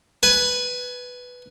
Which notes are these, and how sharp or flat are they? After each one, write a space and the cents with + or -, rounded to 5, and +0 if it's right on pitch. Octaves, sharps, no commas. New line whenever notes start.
B4 +0 G#5 +25